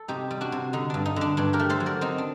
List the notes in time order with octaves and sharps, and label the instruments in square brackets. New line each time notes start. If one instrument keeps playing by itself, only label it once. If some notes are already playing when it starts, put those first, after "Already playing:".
Already playing: [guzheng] A4
C3 D#4 G4
G3
D4 F#4
C3
D3 D#4
G2 D4
D#4
D3 D4
G2 D4
G4 A#4
A3
A4 C5
F#3
A#4 D5
C4 D#4
D4